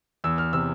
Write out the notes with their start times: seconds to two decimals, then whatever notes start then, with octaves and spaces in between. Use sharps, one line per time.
0.24 E2 E6
0.38 F6
0.53 C3 E6